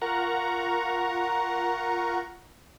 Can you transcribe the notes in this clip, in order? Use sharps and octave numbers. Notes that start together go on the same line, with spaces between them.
F4 A#4 F#5 A#5 C#6